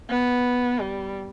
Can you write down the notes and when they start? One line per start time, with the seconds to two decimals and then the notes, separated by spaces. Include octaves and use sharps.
0.10 B3
0.79 G3